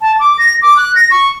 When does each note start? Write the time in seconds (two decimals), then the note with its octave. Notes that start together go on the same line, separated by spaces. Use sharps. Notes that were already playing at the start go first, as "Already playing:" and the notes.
0.01 A5
0.19 D6
0.38 A#6
0.62 D6
0.77 F#6
0.95 A#6
1.11 C#6